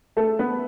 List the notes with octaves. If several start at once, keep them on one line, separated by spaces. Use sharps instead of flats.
A3 A4
B3 B4